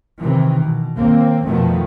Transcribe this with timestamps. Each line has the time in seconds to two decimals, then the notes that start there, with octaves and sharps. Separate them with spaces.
0.21 C3 D#3 E3
0.60 B2
0.96 D#2 A#3 C4
1.46 F2 B2 D#3 F3 A3 B3